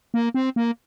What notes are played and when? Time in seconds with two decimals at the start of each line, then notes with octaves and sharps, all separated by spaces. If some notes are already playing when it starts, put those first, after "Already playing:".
0.14 A#3
0.34 C4
0.56 A#3